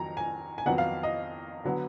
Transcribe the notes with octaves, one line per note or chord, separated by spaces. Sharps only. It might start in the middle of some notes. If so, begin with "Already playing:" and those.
Already playing: F2 D#3 F#3 A#5
G#5
G#5
F2 D#3 F#3 B3 F#5
F5
D#5
D3 F#3 B3